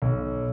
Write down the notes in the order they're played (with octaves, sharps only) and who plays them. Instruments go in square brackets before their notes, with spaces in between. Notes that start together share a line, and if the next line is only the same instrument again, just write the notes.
[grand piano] B1